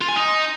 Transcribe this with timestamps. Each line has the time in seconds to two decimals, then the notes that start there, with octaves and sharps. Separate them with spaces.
0.01 F4
0.08 G#5
0.16 D#4